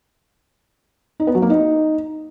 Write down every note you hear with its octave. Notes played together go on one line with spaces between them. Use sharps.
D#4
B3
F#3
A#3
D#4